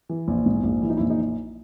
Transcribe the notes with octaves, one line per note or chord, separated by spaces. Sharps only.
E3
A#1
G#2
A#1
E3 E4
D#4
E4
A#1
D#4